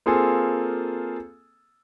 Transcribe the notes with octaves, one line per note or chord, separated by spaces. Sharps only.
A#3 C4 F4 G#4 A4 G#5